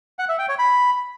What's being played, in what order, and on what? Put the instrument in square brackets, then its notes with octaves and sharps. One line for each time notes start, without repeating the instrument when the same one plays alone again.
[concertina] F#5
E5
G5
C#5
B5